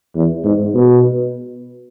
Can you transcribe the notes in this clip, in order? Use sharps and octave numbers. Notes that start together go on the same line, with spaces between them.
E2
G#2
B2